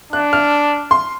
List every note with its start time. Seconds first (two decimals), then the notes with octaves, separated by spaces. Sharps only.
0.12 D4 F#6
0.33 F6
0.91 C6